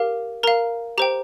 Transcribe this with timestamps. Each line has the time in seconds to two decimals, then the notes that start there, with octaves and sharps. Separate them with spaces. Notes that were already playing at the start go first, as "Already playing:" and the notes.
Already playing: G4 A#4 F5
0.43 A#4 F5 A#5
0.98 G4 C5 G5 A#5